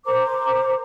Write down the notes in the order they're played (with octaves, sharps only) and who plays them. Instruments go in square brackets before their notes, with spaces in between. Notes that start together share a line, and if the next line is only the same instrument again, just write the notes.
[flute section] A#4 C5 A#5 D6